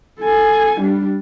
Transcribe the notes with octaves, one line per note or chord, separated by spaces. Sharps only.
A4 G#5
G3 D4